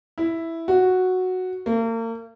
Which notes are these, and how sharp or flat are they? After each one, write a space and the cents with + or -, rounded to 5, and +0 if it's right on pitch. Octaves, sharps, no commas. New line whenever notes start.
E4 +0
F#4 -5
A#3 -40